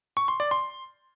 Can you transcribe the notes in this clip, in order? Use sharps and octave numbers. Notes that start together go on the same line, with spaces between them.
C#6
C6
D5
C6